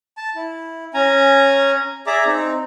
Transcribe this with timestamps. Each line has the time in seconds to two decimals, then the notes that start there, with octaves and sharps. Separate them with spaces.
0.17 A5
0.36 E4
0.94 C#4 G#5 A#5
2.07 G#4 D5 E5 A#5 D6
2.26 C4 D#4